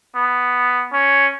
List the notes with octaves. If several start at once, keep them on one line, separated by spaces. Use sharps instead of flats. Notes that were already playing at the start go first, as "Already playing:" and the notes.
B3
C#4